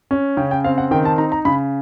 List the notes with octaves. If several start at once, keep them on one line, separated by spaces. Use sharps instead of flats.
C#4
C#3 G5
G5
C4 F5
F#5
D#3 G5
A5
D#4 A#5
A#5
C#3 B5